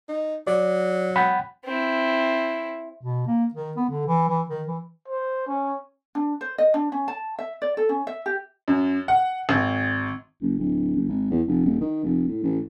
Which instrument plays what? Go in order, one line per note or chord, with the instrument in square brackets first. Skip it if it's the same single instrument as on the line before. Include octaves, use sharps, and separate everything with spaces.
[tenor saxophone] D#4
[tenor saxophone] F#3 [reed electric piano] D5
[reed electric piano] F#5 G5 B5
[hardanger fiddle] C4 E4
[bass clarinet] B2
A#3
D#3
B3
D3
E3
E3
D#3
E3
[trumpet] C5
C#4
[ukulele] D4
C5
D#5
D4
C#4
A5
E5
D5
A4
C#4
E5
G4
[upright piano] F#2
F#5
G#1
[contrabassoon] F#1
D1
F#1
G#1
E2
F1
D#1
D#3
F1
A2
A1